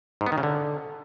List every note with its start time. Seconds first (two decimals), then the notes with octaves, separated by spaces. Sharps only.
0.21 G#2
0.26 B3
0.32 D#3
0.38 C#3
0.43 D3